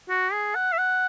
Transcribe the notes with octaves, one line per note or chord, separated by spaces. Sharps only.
F#4
G#4
F#5
E5
F#5